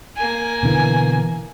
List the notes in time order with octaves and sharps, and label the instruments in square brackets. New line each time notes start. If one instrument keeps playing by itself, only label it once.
[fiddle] A#3 G#5
[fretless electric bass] B2 D3 E3